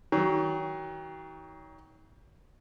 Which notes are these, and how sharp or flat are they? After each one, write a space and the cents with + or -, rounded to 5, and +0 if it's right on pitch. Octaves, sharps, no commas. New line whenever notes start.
D#3 +40 F#3 +30